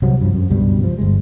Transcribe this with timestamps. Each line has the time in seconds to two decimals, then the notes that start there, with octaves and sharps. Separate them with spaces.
0.02 C2 C3 F#3
0.21 G2 F3
0.34 F#2
0.50 C#2 G2 B2 G3
0.83 F3
0.98 G1 G#3